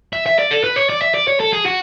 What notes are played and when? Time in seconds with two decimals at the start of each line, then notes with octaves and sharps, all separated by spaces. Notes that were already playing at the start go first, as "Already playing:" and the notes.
0.13 E5
0.26 E5
0.39 D5
0.51 A4
0.64 B4
0.76 C#5
0.90 D5
1.02 E5
1.14 D5
1.27 C#5
1.40 A4
1.53 G#4
1.65 F#4